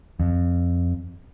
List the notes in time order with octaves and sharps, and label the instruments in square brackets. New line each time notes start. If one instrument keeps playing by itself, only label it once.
[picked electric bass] F2